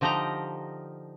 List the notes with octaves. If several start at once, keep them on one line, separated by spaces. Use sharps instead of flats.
D3 F3 D#4 G4 D#5 A#5